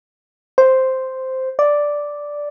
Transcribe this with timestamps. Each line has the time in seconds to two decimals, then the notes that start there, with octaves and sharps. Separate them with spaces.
0.58 C5
1.59 D5